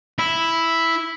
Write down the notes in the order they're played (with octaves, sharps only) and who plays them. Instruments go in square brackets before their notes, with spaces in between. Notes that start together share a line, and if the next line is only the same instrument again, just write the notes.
[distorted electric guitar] E4